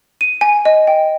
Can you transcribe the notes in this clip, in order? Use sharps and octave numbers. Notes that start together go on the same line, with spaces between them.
D#7
G#5
D#5
G5